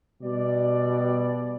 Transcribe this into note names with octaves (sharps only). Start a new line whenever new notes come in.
B2 G3 D5